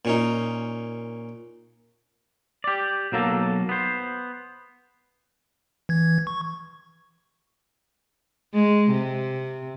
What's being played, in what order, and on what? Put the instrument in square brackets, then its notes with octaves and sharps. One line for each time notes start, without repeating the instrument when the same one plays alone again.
[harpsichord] A#2 C#4 D#4
[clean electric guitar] G4 D5
B1 F#3 A#3 A4
B3 C5
[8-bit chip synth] E3 G#6
C#6
[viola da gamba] G#3
C3